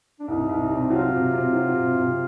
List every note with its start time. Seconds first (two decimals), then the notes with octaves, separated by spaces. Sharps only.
0.20 D4
0.28 C2 D#4
0.49 C2
0.70 C3
0.90 F#3 F4
1.11 C3
1.33 C3
1.53 F#3
1.74 C3
1.94 C3